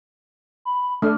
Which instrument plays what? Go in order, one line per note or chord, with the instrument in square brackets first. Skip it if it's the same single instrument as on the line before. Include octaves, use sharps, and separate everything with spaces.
[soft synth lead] B5
[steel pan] A3 D4 [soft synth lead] F6